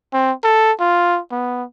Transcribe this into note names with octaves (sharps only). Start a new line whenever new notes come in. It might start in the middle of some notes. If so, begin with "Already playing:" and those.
C4
A4
F4
B3